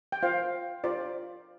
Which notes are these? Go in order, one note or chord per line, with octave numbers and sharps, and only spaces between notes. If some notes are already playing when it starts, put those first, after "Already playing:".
G5
F4 C5 F5
F4 C5 D5